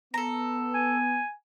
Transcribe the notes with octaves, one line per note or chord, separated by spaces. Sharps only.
B3 A4 A#5
G#5